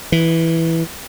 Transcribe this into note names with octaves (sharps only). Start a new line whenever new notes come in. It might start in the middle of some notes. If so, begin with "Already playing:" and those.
E3